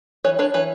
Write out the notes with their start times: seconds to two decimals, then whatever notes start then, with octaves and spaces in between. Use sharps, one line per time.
0.24 E3 B4 C#5
0.39 D4 B4 C#5
0.54 E3 B4 C#5